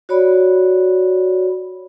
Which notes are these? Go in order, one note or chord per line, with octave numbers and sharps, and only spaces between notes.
F#4 C#5 D5 B5